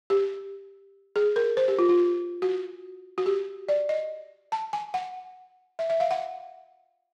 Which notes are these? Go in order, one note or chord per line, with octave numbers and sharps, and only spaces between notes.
G4
G#4
A#4
C5
G4
F4
F4
F#4
F#4
G4
D5
D#5
A5
G#5
F#5
E5
E5
F5
F#5